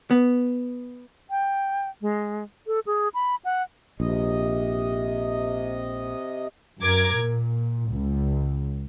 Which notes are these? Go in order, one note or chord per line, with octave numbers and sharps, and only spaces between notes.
B3
G5
G#3
A4
G#4
B5
F#5
A#1 C3 D#5
F#2 A#4 D6 G#6
A#2
C#2